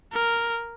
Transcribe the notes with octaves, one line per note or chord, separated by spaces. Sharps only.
A#4